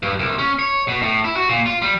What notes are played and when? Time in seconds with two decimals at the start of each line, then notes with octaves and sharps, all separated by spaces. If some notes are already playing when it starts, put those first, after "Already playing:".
0.03 G2
0.19 C2
0.39 C#4
0.59 C#5
0.88 B2
1.02 A2
1.24 E4
1.36 F#4
1.49 A#2
1.66 F4
1.82 G3